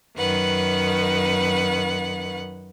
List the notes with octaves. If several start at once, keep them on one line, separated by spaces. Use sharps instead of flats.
F#2 D#3 B4 F#5